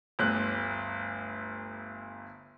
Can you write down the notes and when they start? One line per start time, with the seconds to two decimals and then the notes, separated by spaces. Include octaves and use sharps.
0.19 G1 D2 F#6